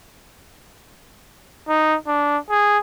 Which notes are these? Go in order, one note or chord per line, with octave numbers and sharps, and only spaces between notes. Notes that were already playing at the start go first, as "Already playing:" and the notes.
D#4
D4
G#4